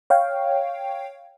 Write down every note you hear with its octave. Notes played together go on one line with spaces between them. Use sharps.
C#5 F5 G5